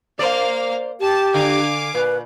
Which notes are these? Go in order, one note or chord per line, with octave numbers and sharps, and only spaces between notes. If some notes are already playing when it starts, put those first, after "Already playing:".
A#3 C5 D5 F5
G4 A5
D3 F5 G#5 D6
A#2 B4